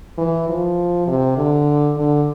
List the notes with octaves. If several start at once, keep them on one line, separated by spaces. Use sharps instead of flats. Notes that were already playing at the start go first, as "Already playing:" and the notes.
E3
F3
C3
D3
D3